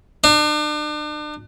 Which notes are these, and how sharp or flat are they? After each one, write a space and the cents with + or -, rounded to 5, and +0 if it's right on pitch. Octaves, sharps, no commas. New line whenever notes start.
D4 +40